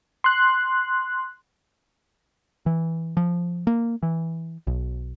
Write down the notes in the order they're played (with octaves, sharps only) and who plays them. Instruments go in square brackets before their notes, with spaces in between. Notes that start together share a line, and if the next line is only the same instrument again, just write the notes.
[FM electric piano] C6 F#6
[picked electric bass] E3
F3
A#3
E3
B1